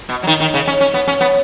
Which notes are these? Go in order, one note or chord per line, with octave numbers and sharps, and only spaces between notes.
B2
F#3
D#3
D#3
C#3
C#4
C#4
B3
C#4
B3